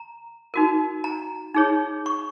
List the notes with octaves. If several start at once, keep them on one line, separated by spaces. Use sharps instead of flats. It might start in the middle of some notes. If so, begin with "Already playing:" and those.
Already playing: A#5
D#4 F#4 A#4
A#5
D#4 G#4 C#5
C#6